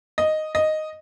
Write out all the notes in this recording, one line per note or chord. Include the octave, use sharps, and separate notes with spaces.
D#5
D#5